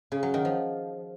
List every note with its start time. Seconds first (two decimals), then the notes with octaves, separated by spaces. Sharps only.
0.12 C#3
0.23 F#3
0.34 D#3
0.45 F3